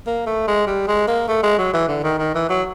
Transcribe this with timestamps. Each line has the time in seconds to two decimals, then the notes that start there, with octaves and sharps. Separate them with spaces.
0.07 A#3
0.27 A3
0.48 G#3
0.67 G3
0.88 G#3
1.07 A#3
1.28 A3
1.43 G#3
1.58 F#3
1.74 E3
1.88 D3
2.03 D#3
2.18 D#3
2.35 E3
2.49 F#3